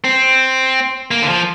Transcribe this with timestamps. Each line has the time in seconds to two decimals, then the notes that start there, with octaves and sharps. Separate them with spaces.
0.04 C4
1.11 A#3
1.22 D3
1.28 F3